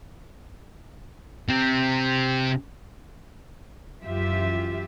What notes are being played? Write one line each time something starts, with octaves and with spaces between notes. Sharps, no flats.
C3 C4
F#2 E3 F4 G4 E5